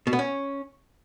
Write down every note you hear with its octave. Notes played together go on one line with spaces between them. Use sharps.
B2
B3
C#4